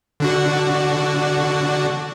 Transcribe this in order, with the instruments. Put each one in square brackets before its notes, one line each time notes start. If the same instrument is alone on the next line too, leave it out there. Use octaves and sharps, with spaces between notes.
[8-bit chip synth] D3 D4 F#4